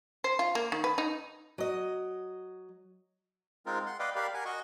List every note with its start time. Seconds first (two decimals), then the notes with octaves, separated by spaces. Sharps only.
0.24 C5
0.39 F4
0.55 A#3
0.72 D#3
0.84 B4
0.98 D#4
1.58 F#3 D#5
3.66 G#3 C4 D#4 F4 A#4
3.86 F#5 C6
3.99 B4 D5 D#5 F5 G5
4.16 G4 A#4 D5 F5 B5
4.34 A#4 F#5 G#5
4.45 F#4 D#5 F#5 C#6